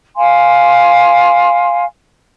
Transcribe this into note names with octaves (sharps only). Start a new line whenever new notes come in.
F5 G#5 C6